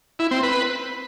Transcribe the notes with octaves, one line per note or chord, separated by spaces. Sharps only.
E4
C4
B4